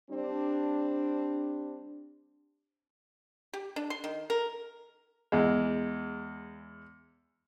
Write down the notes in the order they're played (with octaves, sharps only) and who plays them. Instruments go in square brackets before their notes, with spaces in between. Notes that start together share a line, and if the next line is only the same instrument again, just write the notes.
[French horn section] G3 C4 D4
[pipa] G4
D4
C6
D#3
A#4
[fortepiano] E2 G#3